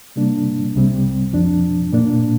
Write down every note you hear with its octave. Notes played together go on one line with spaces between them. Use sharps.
C3 G3 A#3 D4
C2 C3 G3 C4
F2 F3 D4
A#2 A#3 D4